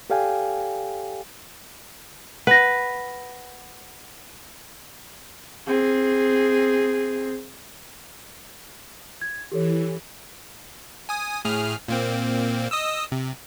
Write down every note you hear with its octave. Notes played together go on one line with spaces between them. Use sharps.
G4 A4 D5 F5 G5 G#5
B4 F#5 A#6
C4 G#4
G#6
E3 G4 A4 C#5
G#5 D#6
A2 G#4 F6
A#2 A#3 C4
D#5 D#6 E6
C3